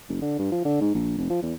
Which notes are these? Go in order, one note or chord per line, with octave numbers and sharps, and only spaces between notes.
F#1
D3
G2
F3
D3
G#2
A#1
F1
F3
E2